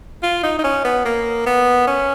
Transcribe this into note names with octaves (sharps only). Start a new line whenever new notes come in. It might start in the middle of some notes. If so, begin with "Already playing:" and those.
F4
D#4
D#4
C#4
B3
A#3
B3
C#4